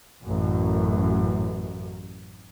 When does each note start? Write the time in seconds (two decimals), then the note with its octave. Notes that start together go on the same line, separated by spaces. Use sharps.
0.22 A1 F#2